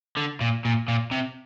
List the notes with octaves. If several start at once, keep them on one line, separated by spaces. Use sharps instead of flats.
D3
A#2
A#2
A#2
C3